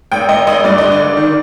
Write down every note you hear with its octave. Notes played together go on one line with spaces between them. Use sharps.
G#1 G5
G#1 D#5
G#1 D#5
G2 D5
D3 D#5
D5
G#1
D#3